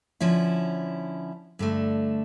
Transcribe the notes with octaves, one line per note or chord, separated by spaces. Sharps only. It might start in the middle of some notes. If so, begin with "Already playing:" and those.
D3 F3 C#4 E4
G2 D3 A3